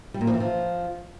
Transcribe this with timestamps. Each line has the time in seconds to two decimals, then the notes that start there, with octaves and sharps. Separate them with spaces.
0.14 G3
0.21 A#2
0.27 F3
0.34 E3
0.40 F3